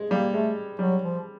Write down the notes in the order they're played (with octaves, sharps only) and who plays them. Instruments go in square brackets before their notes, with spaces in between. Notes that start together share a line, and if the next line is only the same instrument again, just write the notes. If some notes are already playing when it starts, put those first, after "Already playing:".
Already playing: [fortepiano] G#3
[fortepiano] G3 [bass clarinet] A#3
[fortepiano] G#3 [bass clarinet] A3
[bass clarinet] F#3 [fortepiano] G3
[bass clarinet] F3